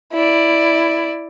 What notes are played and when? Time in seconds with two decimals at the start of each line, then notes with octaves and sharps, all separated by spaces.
0.13 E4 D5